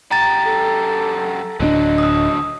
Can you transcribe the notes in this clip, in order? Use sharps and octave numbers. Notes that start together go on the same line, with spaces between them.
F#2 G4 A#5 A6
A4
D1 D3 F#3 C4 D4 D#5
D#6 E6